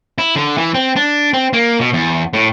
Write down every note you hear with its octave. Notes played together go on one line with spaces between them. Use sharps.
E4
D3
E3
C4
D4
C4
A#3
B2
E2
A2